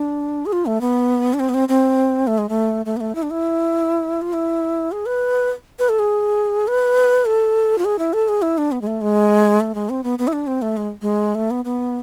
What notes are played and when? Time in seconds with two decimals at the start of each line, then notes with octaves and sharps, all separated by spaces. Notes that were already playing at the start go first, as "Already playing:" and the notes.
Already playing: D4
0.46 G#4
0.53 F4
0.66 A3
0.81 B3
1.34 D4
1.40 C4
1.49 B3
1.54 C4
1.69 C4
2.27 A3
2.38 G#3
2.49 A3
2.86 A3
2.97 B3
3.01 A3
3.15 E4
3.23 D4
3.31 E4
4.22 F4
4.33 E4
4.92 G#4
5.06 B4
5.79 B4
5.89 A4
5.99 G#4
6.68 B4
7.25 A4
7.78 F4
7.85 G#4
7.99 E4
8.13 A4
8.29 G#4
8.42 E4
8.58 D4
8.72 B3
8.81 G#3
8.87 A3
9.01 G#3
9.60 A3
9.75 G#3
9.89 C4
10.04 B3
10.19 B3
10.28 E4
10.33 D4
10.47 C4
10.62 A3
10.77 G#3
11.02 G#3
11.35 A3
11.51 B3
11.65 B3